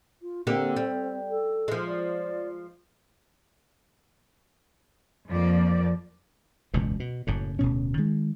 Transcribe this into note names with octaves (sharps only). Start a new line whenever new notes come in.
F4
D3 A#3 C4 G4
G3
A4
F3 G#3
D5
F2 F3 A#3 D5
E1 C#2 F#2 B2
B2
F#1 F#2 A2
D1 D2 B2 C#4
D#3 G#3